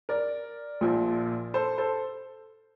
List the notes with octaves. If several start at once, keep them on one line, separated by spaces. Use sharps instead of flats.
A#4 D5
A#1 A#2 F3
A4 C5
A4 C5